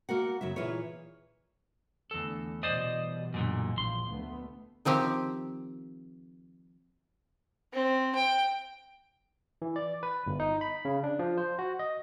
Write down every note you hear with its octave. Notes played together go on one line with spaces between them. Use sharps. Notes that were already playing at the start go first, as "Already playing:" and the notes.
A#3 F#4 A#4 F#5
F#2 C#3 F#3 E5
A#2 E3 F4 G#4 B4 C#5
E2 D3 A3 A4
B2 E3 G3 C5 D5 D#5
F#2 A#2 D3
A#1 E2 F3 C6
D2 A3 B3
D#3 F3 C4 G4
C4
G5
E3
D5
B4
G1
D#4
B5
C#3
D4
F3
C5
F#4
D#5